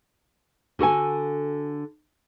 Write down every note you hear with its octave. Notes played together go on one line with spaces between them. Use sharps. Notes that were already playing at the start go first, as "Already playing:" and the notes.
D3 F#4 A4 G#5